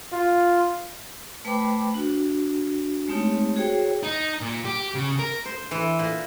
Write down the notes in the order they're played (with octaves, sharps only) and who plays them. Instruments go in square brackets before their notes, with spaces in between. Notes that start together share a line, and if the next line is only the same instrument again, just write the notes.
[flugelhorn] F4
[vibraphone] A3 B4 C5 G5 B5 D6
D4 F#4
G#3 A3 C4 D#4 G4 C#5
F#4 G#4 C5 C#5 G5
[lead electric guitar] D#4
A#2
G4
C#3
A#4
[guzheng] C5
E3
A#2